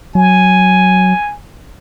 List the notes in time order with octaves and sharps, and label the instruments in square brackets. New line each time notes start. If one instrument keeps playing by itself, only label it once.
[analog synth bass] F#3 [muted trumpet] G#5